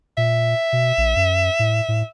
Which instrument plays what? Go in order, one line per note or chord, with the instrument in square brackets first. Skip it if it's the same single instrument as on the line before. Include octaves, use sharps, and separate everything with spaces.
[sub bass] A#2 [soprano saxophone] E5
[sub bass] B2
A#1
F#2
A2
A2